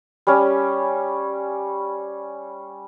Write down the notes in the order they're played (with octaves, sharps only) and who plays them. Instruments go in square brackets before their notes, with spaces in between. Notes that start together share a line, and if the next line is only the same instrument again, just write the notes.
[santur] G3 C#4